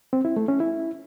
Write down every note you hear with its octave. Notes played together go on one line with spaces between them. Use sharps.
C4
E4
A3
C#4
E4